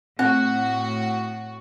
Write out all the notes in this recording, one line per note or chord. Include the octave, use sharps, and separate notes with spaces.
A2 C4 F#4 F#5